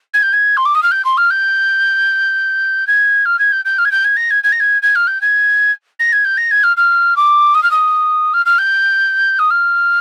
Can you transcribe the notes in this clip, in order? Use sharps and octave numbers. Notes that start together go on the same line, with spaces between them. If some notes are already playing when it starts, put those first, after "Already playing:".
G#6
G6
G#6
C6
D6
D#6
F6
G6
C6
F6
G6
G#6
F6
G#6
G6
G6
F6
G#6
G6
G#6
A#6
G#6
G#6
A#6
G#6
G#6
F6
G6
G#6
A#6
G#6
G6
A#6
G#6
F6
F6
D6
D#6
F6
D#6
F6
F6
G6
D#6
F6